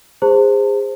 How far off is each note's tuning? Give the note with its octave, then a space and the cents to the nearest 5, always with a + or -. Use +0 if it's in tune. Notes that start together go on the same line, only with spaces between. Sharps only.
G#4 -30 C5 +0 A5 +45